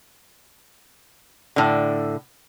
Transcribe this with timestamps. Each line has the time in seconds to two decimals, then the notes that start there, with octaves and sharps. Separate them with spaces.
1.56 A2 D3